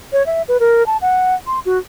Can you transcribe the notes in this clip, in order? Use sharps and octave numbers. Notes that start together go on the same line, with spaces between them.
C#5
E5
B4
A#4
A5
F#5
C6
F#4